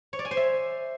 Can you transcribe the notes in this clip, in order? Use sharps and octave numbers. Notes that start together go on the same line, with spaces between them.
C#5
D5
G#5
C5
E5